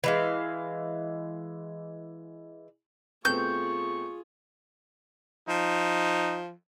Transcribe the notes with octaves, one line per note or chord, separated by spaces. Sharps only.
E3 G#3 F5
B2 A3 C4 F4 G#4 C#6 G6
F3 D#4